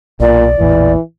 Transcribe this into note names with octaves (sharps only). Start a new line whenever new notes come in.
B1 A#2 D5
A1 E2 A#2 E3